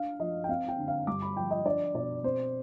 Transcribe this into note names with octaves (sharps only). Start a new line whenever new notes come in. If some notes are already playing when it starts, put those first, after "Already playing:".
Already playing: D4 F5
F3 D#5
G5
C4 F5
G5
D3
F5
G2 D6
B5
F3 G5
D#5
D4 D5
B2 D5
C4 C5